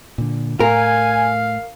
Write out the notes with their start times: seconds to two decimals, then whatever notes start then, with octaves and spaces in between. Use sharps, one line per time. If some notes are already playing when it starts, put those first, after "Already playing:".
0.18 A#2 D3
0.60 A2 A#4 F5 G#5